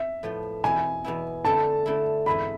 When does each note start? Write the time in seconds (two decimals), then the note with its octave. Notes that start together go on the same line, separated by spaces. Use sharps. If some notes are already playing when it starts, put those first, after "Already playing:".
Already playing: E5
0.23 A2 F3 B3 F4
0.64 E2 B2 B3 E4 G#5
1.04 E2 B2 B3 E4
1.45 D3 A3 E4 A5
1.86 D3 A3 E4
2.26 G#2 E3 B3 E4 B5